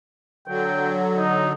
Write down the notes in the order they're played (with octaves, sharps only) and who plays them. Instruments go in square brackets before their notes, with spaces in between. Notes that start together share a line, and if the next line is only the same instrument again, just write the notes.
[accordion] D3 F#3 [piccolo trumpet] G5
[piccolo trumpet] D#4